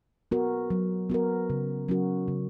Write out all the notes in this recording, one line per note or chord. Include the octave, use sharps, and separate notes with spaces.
B3 F#4 A#4
F#3
B3 F#4 A#4
C#3
F#3 C#4 F#4 A#4
C#3